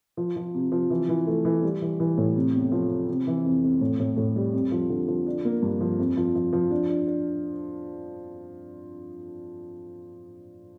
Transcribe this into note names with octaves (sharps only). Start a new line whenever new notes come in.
F3
F3
C3
F3
E3
E3
A3
E3
G3
E3
E3
A2
C3
E2
F3
C3
C3
E3
F2
F2
A2
A2
A2
G3
F2
F3
D3
F3
D4
A#3
G2
F3
F2
F3
F3
F3
D4
D4
D4